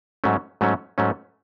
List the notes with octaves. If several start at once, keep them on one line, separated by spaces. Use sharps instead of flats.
G#2 F#3 A3 C#4
G#2 F#3 A3 C#4
G#2 F#3 A3 C#4